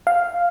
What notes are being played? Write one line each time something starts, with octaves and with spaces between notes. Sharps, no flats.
F5